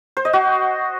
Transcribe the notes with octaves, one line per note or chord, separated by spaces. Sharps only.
C5
D#5
F#4